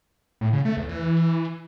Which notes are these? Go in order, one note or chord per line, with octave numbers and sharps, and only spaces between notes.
A2
C#3
A3
E2
E3